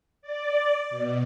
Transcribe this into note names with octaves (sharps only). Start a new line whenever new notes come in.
D5
B2